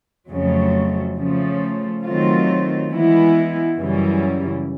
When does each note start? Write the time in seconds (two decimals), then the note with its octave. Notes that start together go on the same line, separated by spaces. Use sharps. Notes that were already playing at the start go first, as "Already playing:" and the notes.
0.30 F2 C#3 F#3 A3
1.17 C#3 F3 A3
2.05 D#3 F#3 A3 C4 F4
2.91 E3 G#3 B3 E4
3.78 F#2 C#3 E3 G3